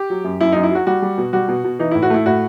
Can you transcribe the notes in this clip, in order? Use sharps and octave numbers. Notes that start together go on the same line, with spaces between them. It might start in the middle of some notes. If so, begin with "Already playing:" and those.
Already playing: G4
F#3
F#2
F#2 E4
F#2 D#4
E4
F#3 F#4
G3 F#4
G3
B2
G3 F#4
B2
B2
E3 D#4
A2 E4
F#4
A3 E4
A2 F#4